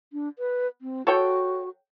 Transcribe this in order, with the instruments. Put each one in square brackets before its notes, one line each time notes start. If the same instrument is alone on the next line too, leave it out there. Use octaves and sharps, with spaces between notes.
[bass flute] D4
B4
C4
[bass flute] F#4 [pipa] A4 C#5 G5